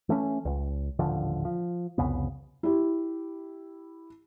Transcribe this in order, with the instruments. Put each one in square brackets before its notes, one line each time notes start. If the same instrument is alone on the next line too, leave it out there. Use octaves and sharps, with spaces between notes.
[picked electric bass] E3 A3 A#3 C#4
C#2
D#1 A1 D3 F3
F3
C2 F2 C#3 B3
[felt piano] E4 G4